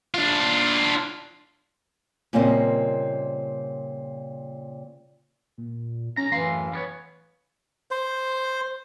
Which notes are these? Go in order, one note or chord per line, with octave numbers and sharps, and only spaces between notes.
D4 F4
A#2 C#3 G3 C4 A#4 D#5
A#2
B1 C#4 A#5
F#2 A2 E3 F5 C6
G3 B3 C#5
C5